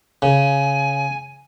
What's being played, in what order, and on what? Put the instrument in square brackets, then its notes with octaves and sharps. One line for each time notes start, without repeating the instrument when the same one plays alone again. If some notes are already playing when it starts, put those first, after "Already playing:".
[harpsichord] C#3 [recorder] G#5